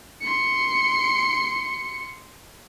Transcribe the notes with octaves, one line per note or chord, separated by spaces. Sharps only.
C6 C#7